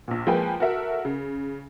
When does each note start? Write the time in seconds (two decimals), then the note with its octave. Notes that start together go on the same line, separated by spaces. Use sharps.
0.08 A#1 A#2
0.27 F3 G#3 A#3 B4 G5 G#5
0.60 F#4 A4 A#4 E5 F#5
1.05 C#3